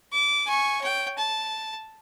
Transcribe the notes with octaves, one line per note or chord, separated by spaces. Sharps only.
D6
G#5 C#6
C#5 G5
A5